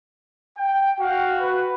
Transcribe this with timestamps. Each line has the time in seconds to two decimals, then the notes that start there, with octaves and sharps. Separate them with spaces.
0.57 G5
1.00 F#4 F5 G5
1.40 B4